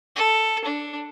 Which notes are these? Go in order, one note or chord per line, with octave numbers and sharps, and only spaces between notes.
A4
D4